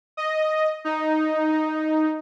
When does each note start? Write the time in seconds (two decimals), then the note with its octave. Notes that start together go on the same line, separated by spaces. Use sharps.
0.17 D#5
0.85 D#4
1.52 D#4